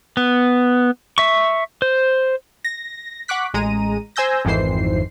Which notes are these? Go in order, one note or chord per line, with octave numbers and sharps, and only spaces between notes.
B3
E5 C#6
C5
A#6
F#5 C#6 D6 F#6 B6
A1 G#3 A#5 D#7
C5 G#5 E6 G6 A#6
G#1 F2 D#3 E3 C5 C7